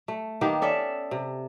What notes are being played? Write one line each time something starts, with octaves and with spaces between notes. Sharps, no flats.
A3
D#3 A#3 B3 G4
C#4 A4 D5 E5
C3